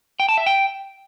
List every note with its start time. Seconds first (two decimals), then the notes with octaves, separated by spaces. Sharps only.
0.20 G5
0.29 A5
0.37 E5
0.46 G5